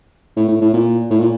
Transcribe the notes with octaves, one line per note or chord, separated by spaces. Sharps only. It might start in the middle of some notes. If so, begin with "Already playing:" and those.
A2
A2
A2
A#2
A2
A#2